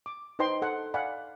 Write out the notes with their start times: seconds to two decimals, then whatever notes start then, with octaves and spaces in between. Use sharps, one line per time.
0.06 D6
0.39 D#4 B4 C5 D#5 G5 C6
0.62 A4 F#5
0.94 D5 F5 F#5 G#5 B5